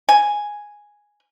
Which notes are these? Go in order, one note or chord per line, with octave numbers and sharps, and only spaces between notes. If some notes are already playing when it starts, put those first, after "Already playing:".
G#5